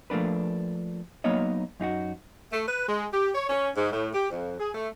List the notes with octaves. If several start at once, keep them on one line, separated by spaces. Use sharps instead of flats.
F3 A3 A#3 D4 B4
F#3 A#3 B3 D#4 C#5 D#5
F#2 D#4 F4 F#4
A3
B4
G#3
G4
C#5
C#4
G#2
A2
G4
F2
G#4
A3